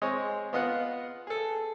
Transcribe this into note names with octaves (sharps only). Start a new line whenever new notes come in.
G#3 C4 C#5 D#5
B3 F4 D#5 F5 F#5 F#6
G#4 A4